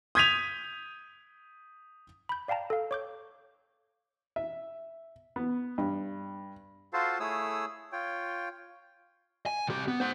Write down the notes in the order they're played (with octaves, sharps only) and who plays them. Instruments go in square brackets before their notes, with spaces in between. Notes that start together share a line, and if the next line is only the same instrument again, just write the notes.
[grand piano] D#6 G6 G#6 B6 D#7 F7
[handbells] B5 G6
D5 F5 G5 A5 A#5
A4 F5
C#5 D6 G6
[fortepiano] E5
B3
G2
[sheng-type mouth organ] F4 F#4 A4 C5 F5 A5
A3 E4 G#4 C#5 D#6 E6
F4 C#5 G5
[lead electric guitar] G#5
C2 G4
B3
C5 F#5